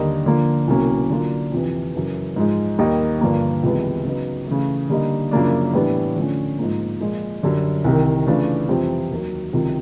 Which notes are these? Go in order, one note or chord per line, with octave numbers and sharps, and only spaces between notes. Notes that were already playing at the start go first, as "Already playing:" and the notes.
Already playing: D#2 D3 G3 A#3 D#4
D3 F3 A#3
C2 B2 F#3 A#3 C#4
D3 F#3 A#3 D4 F4
F2 C3 E3
F#2 C#3 E3
G#2 F3 G#3
D#2 D#3 G3 A#3 D#4
G2 D3 F3 A#3
C#2 C3 E3 G#3 B3
C#3 F#3 B3 D#4
C#3 E3 A3
D3 G3 A#3 D#4
F#2 C#3 F3 A#3 D4
A2 E3 G3 B3 D4
D3 F3 A3 C#4
G#2 F3 A#3
A#2 F3 G#3
F#2 D3 G3
C2 C3 D#3
C#3 E3 A3 D4 F4
F2 C3 E3 G3 C4
D#2 D#3 F#3
C#2 C3 D#3 F#3